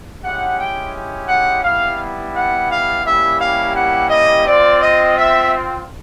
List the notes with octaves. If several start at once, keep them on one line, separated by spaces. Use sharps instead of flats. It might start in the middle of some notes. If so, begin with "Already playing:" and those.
G#3 C#4 E4 G4 F#5
G5
F#5
G3 B3 E4 F5
F#5
F5
G3 A#3 C#4 E4 G4 E5
F5
F#5
D#5
C4 F4 D5
D#5
E5